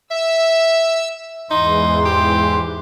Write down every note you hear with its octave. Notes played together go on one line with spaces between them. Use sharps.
E5 E6
E2 G#2 E3 D#4 C6
G4